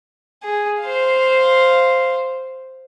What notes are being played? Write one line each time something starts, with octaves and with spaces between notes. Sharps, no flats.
G#4
C5 F5